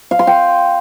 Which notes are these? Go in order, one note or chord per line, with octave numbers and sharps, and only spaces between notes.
F5
C6
G5